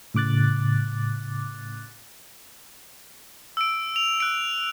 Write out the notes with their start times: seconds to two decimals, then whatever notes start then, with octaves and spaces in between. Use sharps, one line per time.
0.14 A2 C#3 D6 F#6 A6
3.57 E6 D7
3.96 F7
4.20 F#6 D7